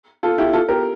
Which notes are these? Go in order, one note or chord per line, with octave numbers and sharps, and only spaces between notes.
F4 A4
E4 G4
F4 A4
G4 A#4